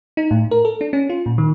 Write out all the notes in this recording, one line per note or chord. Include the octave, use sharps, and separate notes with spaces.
D#4
A2
A#4
A4
D4
C#4
F4
A#2
D#3